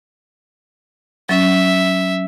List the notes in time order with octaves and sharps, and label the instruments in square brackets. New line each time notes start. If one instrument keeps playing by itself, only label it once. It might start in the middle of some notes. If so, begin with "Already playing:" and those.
[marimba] F#3 C#4 [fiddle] E5